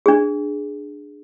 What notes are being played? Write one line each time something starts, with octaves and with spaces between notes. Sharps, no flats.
D4 G#4